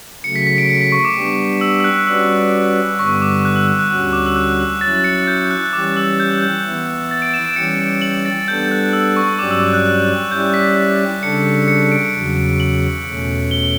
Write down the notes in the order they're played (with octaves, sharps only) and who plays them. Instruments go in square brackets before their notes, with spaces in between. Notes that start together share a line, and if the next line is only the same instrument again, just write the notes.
[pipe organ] C#3 F#3 A3 [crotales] C#7
[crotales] B6
B6
D7
C#7
B6
C#6
D6
[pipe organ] G3 B3 D4 G4
[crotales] E6
E6
F#6
[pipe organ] G3 C#4 F#4 B4 D5 [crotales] E6
[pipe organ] G2 D3 G3 B3 [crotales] C#6
[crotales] D6
F#6
E6
F#6
F#6
[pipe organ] D2 D3 G3 C#4 F#4
[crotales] D6
E6
F#6
E6
[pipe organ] F#3 C#4 E4 [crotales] A6
[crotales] C#7
G6
F#6
[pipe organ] E3 G3 C#4 G4 [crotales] D6
[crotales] E6
G6
G6
[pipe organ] E3 B3 E4
[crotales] A6
D7
E7
D7
[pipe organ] E3 G3 C#4 G4 [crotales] C#7
[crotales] D7
F#7
A6
[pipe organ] G3 B3 D4 A4 [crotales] G6
[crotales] F#6
E6
C#6
[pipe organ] G2 F#3 C#4 G4 D5 [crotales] D6
[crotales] E6
F#6
F#6
[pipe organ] G3 C#4 E4 G4 D5 [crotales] G6
[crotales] B6
[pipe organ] C#3 G3 D4 A4 [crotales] C#7
[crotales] C#7
D7
[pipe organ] E2 C#3 F#3
[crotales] F#7
[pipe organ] E2 B2 A3 C#4
[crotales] G7